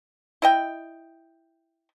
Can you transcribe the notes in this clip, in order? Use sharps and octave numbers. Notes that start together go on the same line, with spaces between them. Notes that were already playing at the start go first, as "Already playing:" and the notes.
E4 D#5 G5